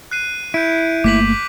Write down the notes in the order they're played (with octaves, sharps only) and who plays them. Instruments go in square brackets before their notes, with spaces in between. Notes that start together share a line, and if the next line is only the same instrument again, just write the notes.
[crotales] F#6 C7 D#7
[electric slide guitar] E4 [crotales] G6 D7
[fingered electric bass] G1 A3 A#3 [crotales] D6 B6 F#7